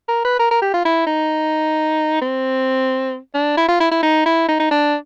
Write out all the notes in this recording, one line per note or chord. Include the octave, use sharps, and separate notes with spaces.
A#4
B4
A#4
A#4
G4
F4
E4
D#4
C4
D4
E4
F4
E4
E4
D#4
E4
D#4
D#4
D4